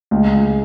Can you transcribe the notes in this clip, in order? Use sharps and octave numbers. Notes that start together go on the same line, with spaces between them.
C#2
C#2